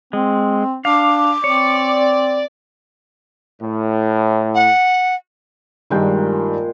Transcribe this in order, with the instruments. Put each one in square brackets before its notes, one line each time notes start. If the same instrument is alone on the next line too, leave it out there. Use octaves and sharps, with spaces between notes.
[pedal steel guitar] G#3 [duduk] C4
[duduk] D4 [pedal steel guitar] F5 [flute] D6
[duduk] C4 [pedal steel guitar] C#5 [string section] D5
[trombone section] A2
[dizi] F#5
[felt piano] G2 D#3 [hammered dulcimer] A#2 G#3 G5